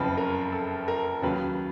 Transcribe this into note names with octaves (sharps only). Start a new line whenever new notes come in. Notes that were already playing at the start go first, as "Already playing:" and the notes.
Already playing: F#1 F2 C#3 B4
A#4
A4
A#4
D#2 C#3 F#3 B4